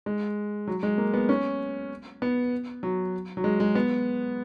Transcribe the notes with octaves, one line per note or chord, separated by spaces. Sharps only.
G#3
F#3
G#3
A#3
B3
C#4
B3
F#3
F#3
G#3
G#3
B3